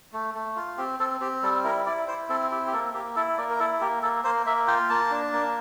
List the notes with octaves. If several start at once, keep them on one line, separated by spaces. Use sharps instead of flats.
A3
A3
F4
C4 G4
C4 A4
C4 G4
G3 A4
E4 A#4
E4 D5
E4 C5
C4 A4
E4 G4
G4
A#3 A4
A#3 G4
E4 A4
A#3 D5
A#4
E4 A4
A#3 G4
A#3 A4
A#3 C5
A#3 E5
F4 G5
A#3 A5
D4
A#3